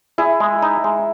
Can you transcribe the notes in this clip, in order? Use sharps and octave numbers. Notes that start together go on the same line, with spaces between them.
E4 G#4
G#3
D#4
G#3